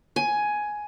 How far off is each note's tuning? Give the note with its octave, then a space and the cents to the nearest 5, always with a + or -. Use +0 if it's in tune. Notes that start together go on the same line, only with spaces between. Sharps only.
G#5 +10